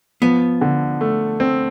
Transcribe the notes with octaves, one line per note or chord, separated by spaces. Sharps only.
F3 B3
D3
A3
C4